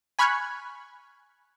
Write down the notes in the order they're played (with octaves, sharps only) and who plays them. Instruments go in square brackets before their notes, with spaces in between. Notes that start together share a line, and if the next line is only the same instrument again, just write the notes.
[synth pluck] G#5 B5 C#6 F6 F#6 G#6